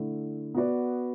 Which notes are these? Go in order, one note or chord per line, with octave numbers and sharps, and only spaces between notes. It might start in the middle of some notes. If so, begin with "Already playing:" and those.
Already playing: D3 A3 E4
B3 F#4 B4 D5